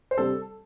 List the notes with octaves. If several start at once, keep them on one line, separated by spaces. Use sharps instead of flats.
C5
C3 G3 D4 A4